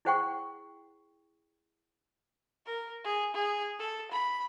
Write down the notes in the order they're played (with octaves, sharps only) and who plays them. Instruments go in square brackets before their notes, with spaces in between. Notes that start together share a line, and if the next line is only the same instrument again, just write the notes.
[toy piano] E4 G#4 C5 F#5 G5 C#6
[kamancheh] A#4
G#4
G#4
A4
B5